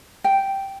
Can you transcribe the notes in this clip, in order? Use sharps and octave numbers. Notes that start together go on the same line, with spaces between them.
G5